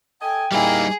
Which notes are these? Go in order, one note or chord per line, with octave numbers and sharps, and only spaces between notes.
A4 D#5 G5 G#5
G3 A#3 D#4 E4 G#4